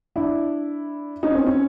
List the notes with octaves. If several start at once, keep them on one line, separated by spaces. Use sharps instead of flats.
D4 E4
C#4 D#4
C4
C#4